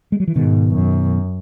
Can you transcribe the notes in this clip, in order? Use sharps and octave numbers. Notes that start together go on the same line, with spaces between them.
G#3
F#3
E3
G#2 B2 D#3
F#2